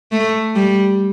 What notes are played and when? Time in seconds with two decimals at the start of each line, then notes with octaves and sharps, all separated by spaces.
0.12 A3
0.55 G3